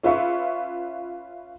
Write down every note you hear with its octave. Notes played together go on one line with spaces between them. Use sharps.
C#4 F4 B4 E5 C#6